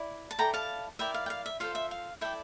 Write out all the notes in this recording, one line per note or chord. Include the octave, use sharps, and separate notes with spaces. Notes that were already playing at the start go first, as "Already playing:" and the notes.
Already playing: E4 D5
A5
E4 A4 D5 G5 A#5
F5 A5
E4 A#4 D5 E5 G5
F5
G5
F5
E5
F4 A4 C5 F5
E5
F5
E4 A4 D5 E5 G5